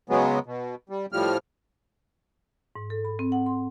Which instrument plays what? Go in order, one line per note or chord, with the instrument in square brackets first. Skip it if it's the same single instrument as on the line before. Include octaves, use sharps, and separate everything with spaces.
[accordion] C#3 F#3 G#3 B3
B2
G3
A2 F3 G3 F6
[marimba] G#2
A4
B5
C4
F#5
C6